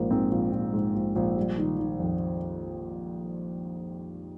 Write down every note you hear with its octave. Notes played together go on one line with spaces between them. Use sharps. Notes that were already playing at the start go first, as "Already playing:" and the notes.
Already playing: A#1 G#2 A#3
G#2 C4
A#1
A#1
G#2
A#1
A#1
G3
D#3
D#3
F2